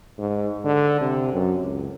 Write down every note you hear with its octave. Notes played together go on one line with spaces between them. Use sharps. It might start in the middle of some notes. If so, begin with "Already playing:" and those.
G#2
D3
C3
F#2
C#2